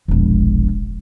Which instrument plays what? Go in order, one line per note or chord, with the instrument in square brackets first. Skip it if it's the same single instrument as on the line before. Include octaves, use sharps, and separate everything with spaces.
[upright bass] E1 A#1